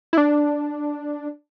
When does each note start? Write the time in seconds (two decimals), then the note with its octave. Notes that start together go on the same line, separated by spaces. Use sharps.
0.13 E4
0.18 D4